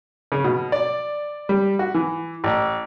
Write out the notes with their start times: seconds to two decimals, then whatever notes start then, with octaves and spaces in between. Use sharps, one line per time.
0.32 C#3
0.44 B2
0.72 D5
1.49 G3
1.79 F#4
1.95 E3
2.44 A1